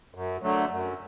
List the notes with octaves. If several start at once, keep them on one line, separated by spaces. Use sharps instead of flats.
F#2
D3 F#3 A3
F#2